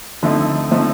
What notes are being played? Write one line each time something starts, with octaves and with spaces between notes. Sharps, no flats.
D3 F3 A3 C4 D#4
D3 F3 A3 C4 D#4